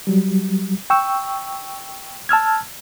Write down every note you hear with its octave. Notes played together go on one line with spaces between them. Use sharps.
F#3 G3
G5 C#6 E6
A5 E6 F6 G#6